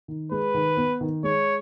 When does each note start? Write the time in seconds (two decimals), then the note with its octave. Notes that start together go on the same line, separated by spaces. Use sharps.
0.08 D#3
0.31 G#3 B4
0.54 D#3
0.77 B3
1.01 D#3
1.24 G#3 C#5